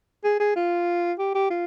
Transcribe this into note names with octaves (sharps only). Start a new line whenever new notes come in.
G#4
G#4
F4
G4
G4
F4